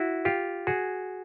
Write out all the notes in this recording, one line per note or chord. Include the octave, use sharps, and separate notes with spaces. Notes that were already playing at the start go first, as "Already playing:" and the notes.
Already playing: E4 F#4
F4 G4
F#4 G#4